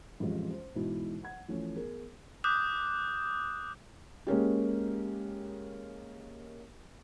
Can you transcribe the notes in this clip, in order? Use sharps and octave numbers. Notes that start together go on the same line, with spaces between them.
A1 F2 G3 G#3 F4
C5
G#2 B2 E3 G#3 E4 F#4
F#5 G#6
E3 F3 A3 C#4 F4
B3 G#4 A#4
D6 D#6 F#6 G6
G#3 A#3 C#4 G4